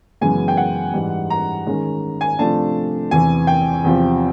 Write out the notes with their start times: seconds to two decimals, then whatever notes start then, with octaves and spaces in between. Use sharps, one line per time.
0.21 F#2 C#3 E3 G#3 B3 G#5
0.48 G5
0.57 F#5
0.94 G#2 E3 G3
1.30 A#5
1.67 D#3 G#3 C#4
2.21 G#5
2.39 C3 F3 A3 D4 A5
3.11 E2 C3 E3 G#5
3.47 G5
3.84 E2 C3 F3